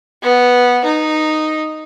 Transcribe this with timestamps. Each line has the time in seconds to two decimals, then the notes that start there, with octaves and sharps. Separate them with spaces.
0.23 B3
0.85 D#4